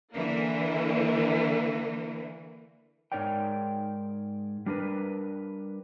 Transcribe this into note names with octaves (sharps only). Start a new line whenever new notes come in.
D3 E3 A#3
G#2 D#4 A#4 C#5 D5 G5
G3 D4 A#4 B4